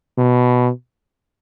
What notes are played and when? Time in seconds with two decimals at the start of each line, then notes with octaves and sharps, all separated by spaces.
0.18 B2